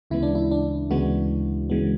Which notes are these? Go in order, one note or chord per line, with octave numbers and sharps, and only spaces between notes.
D2 C#3 E3 G#3 B3 E4
D4
E4
D4
D2 C#3 E3 G#3 B3 F#4
C#3 E3 G#3 B3